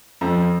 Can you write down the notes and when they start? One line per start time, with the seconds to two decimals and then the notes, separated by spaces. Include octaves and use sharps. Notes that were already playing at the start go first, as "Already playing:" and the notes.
0.21 F2